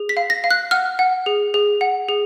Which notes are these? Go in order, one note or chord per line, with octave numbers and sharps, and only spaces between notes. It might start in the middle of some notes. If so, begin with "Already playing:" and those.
Already playing: G#4
B6
F5
A#6
F5
F#6
F#5 F6
F#5
G#4
G#4
F#5
G#4